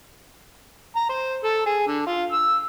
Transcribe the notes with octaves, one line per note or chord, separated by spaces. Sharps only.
A#5
C5
A4
G#4
D3
F4
E6